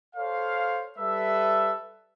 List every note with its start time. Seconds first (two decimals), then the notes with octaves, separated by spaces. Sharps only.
0.16 A4 C5 C#5 F5
0.98 G3 A4 B4 E5